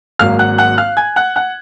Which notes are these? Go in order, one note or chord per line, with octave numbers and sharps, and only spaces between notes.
G#1 G#2 F#3 A#3 F5 F6
F#5 F#6
F#5 F#6
F5 F6
G#5 G#6
F#5 F#6
F#5 F#6